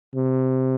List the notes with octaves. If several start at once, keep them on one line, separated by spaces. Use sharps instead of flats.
C3